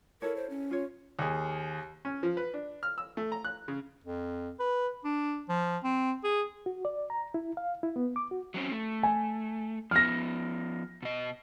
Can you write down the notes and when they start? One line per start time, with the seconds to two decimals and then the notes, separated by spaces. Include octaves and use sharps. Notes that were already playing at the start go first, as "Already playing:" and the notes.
0.22 E4 A4 A#4 C#5
0.36 C5
0.50 C#4
0.71 F4 C#5
1.19 D#2 G#4
2.05 C#4
2.23 F3
2.37 B4
2.54 D4
2.83 F6
2.98 E6
3.17 A3
3.32 A#5
3.45 F#6
3.68 C#3
4.04 F2
4.59 B4
5.04 D4
5.49 F3
5.84 C4
6.24 G#4
6.66 F#4
6.85 D5
7.10 A#5
7.34 E4
7.57 F5
7.83 E4
7.96 B3
8.16 D6
8.31 F#4
8.54 F#3 C4 C#4
8.72 A3
9.03 G#5
9.91 F3 B3 F6 A#6
11.02 B2 D#5